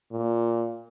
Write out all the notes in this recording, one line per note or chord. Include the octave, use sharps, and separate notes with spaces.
A#2